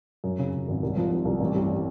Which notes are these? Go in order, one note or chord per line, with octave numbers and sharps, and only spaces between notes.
F#2
C#3
C#3
G#1
C2
F3
F3
C2
A1
G2